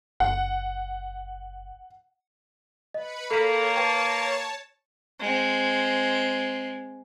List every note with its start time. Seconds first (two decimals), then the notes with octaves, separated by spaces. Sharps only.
0.20 F#1 F#5
2.94 B4 D#5 B5 C#7
3.31 A#3 A4 C#5 A5 B6
3.77 B4 G5
5.20 G#3 C4